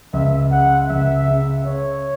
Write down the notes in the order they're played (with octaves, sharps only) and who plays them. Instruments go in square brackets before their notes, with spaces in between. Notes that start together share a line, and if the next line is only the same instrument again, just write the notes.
[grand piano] C#2 [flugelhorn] E5
[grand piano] C#3 [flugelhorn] F#5
[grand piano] C#2 [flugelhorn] E5
[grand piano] C#3
[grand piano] C#3 [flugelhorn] C#5